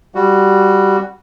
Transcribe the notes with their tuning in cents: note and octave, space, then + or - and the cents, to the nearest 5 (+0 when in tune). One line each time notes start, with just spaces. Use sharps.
G3 +0 F#4 +0